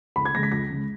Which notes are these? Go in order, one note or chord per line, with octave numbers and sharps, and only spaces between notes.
C#2 B5
G#6
C#3 G#3 A#6
B6
C#2 A#6
C#3 G#3